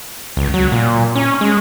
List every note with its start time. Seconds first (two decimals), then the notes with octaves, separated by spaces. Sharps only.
0.37 C#2
0.54 F#3
0.72 A#2
1.16 C#4
1.41 G#3